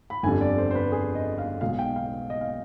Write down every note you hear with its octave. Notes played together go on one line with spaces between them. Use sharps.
B5
G1 F2 D3 G3 G#5
D5
C5
C5
B4
G#4
D#5
F5
B1 B2 G#3 F5
G5
F5
D#5
F5